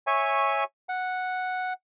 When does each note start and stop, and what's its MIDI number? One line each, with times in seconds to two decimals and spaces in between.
0.07 0.64 73
0.07 0.64 76
0.07 0.64 80
0.07 0.64 85
0.89 1.73 78